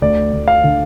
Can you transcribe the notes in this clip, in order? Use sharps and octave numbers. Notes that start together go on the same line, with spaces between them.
D2 D5
D2
F5
D3